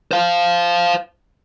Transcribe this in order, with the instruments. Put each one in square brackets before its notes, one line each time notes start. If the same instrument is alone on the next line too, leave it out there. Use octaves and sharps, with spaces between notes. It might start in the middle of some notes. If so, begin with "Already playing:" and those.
[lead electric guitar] C5 F5